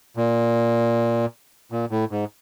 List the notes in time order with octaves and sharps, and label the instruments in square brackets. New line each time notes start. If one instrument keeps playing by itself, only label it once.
[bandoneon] A#2
A#2
A2
G#2